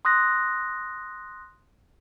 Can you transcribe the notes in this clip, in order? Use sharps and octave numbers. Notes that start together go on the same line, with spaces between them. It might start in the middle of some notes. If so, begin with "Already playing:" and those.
C6 D#6 F#6 A#6